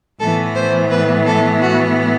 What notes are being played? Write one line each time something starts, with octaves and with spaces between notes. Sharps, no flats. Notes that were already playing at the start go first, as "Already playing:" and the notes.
A2 E3 B3 A4
C5
B4
A4
F#4